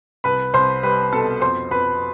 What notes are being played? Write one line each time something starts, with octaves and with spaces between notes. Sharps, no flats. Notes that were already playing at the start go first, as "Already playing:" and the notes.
C2 B4 B5
C2 C5 C6
G3 B4 B5
B2 A4 A5
F2 C5 C6
F2 B4 B5